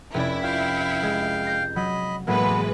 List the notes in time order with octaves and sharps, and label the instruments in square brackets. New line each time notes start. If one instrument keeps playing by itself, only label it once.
[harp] F1 C#4 D5 [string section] E4
[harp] F4 [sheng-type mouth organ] F5 G5
[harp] G#3
G6 A#6 C7
[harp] F#3 [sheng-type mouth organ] D#5 B5
[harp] A2 F#3 A#3 [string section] E3 G#3 B4 [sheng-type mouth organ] B3